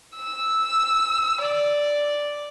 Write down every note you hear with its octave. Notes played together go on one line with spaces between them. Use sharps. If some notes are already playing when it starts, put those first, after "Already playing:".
E6
D5